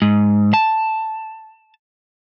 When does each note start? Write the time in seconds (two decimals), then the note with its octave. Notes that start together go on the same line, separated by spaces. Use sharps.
0.02 G#2
0.54 A5